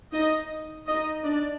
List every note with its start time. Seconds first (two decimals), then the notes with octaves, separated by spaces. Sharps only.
0.13 D#4 D#5
0.87 D#4 D#5
1.23 D4 D5